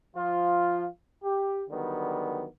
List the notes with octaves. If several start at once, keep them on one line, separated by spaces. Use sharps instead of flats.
F3 F4
G4
D3 D#3 F#3 G3 B3